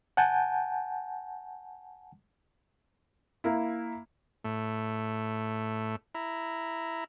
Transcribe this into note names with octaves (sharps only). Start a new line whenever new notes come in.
F#5 G#5 A5 G6
A#3 E4
A2 A3
E4 A#5